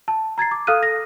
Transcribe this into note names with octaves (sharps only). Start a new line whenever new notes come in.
A5
A#5 G#6 A6 C7
D6
A4 F5 D#6 F6 F#6 D#7
A#6